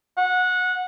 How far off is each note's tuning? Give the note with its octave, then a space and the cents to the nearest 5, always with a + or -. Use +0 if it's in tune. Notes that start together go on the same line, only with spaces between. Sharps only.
F#5 -20